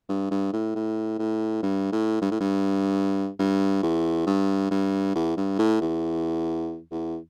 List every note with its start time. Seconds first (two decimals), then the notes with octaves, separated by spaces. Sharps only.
0.09 G2
0.31 G2
0.53 A2
0.75 A2
1.19 A2
1.63 G2
1.92 A2
2.22 G2
2.31 A2
2.40 G2
3.39 G2
3.83 E2
4.27 G2
4.71 G2
5.16 E2
5.37 G2
5.59 A2
5.81 E2
6.91 E2